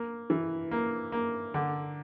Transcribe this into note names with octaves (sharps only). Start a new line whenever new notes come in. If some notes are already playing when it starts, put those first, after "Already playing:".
Already playing: A#3
E3
A#3
A#3
D3